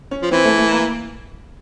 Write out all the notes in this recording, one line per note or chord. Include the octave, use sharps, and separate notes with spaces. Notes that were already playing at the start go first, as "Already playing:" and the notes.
C#4
F3
E3 C4
A3
A3
A#3